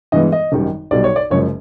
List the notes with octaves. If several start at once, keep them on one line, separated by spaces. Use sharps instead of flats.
G2 E3 G#3 B3 D#5
D#5
G#1 F#2 D#3 G3
B1 B2 G3 D5
C#5
D5
F#1 F#2 C#3 F3 G#3 C#5